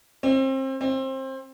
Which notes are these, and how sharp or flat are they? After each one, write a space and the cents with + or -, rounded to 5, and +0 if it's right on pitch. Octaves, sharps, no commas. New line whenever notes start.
C4 +30
C4 +25